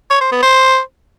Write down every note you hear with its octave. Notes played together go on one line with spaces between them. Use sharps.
C#5
C5
B3
C5